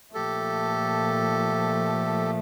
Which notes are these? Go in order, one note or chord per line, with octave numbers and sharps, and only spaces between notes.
A#2 F3 A3 G4 A4